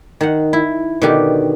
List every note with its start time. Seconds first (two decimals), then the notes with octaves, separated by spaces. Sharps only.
0.21 D#3 F#5
0.53 E4
1.02 B2 D3 D#3 G4